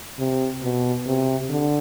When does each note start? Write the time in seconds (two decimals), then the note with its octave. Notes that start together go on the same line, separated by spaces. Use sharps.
0.19 C3
0.63 B2
1.07 C3
1.50 D3